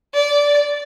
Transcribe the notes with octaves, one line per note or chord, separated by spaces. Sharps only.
D5